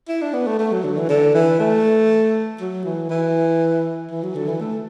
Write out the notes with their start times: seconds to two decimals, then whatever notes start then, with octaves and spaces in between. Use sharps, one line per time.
0.08 E4
0.21 D4
0.33 B3
0.47 A3
0.59 A3
0.72 F#3
0.84 D3
0.97 E3
1.09 D3
1.34 E3
1.59 A3
2.60 F#3
2.85 E3
3.10 E3
4.11 E3
4.23 F#3
4.35 D3
4.48 E3
4.60 A3